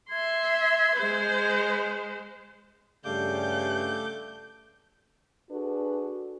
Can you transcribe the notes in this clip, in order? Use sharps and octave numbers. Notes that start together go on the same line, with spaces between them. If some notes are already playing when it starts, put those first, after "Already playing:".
E5 C6 G#6
G#3 C5
G2 C#3 A3 G4 D5 F5 D6 G6
D4 F#4 G#4 A4 B4